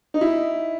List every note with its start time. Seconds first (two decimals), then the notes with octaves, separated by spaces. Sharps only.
0.14 D#4
0.21 E4